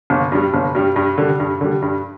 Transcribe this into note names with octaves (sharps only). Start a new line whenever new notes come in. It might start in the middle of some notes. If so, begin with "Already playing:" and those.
G1
G2 G3
G1
G2 G3
G2
D3 G3
G2
D3 G3
G2